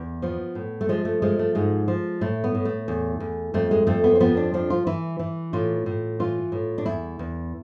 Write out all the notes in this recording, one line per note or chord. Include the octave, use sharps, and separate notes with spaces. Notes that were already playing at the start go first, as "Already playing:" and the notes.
Already playing: E2
F3 B3
A2
A3
F3 G#3
A3
F3 G#3
A3
G#2 G#3
F3
A2 A3
B3
A2
A3
E2
E2
F2 A3
G#3
F2 A3
B3
C4
F3 B3
D4
F3 D4
F4
E3 E4
E3
A2 F4
A2
E3 F4
A2
D4
E2 E4
E2